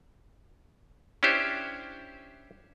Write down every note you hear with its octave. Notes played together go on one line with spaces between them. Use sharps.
C#4 D4 E4 G4 C5